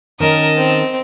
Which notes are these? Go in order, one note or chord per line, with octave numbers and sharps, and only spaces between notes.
D#3 C#4 A#4 D#5 A5
C4